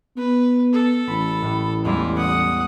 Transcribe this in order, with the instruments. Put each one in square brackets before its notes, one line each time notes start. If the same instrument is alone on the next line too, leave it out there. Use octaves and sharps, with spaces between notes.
[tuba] B3 [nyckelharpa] B4
[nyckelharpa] A4
[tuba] A1 [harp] B5
[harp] A2 A3
[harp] E2 G3 G#3 [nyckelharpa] E4 F4
[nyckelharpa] F#5 D#6